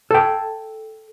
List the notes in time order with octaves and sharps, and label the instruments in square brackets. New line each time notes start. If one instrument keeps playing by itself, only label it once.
[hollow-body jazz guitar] A4 G5